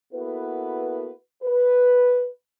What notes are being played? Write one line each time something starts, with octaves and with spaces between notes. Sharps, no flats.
A#3 B3 E4 F#4 A4 B4
B4